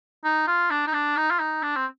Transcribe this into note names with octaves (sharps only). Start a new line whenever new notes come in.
D#4
F4
D4
D#4
D4
D#4
F4
D#4
D4
C4